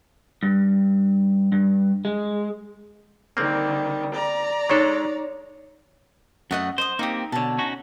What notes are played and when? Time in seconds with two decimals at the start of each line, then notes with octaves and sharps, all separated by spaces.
0.43 G2
1.52 G2
2.05 G#3
3.37 D3 D#3 G3 A#3 C4
4.13 D5 A#5
4.70 G#3 D4 D#4 A4 C#5 C#6
6.51 F#2 A3 F#4 D#5 F#5
6.78 C5 D#5 D#6
6.99 A#3 C4 D#4 G4 D#6
7.32 B2 D3 C#5 A5
7.58 C#4 D#4 F#4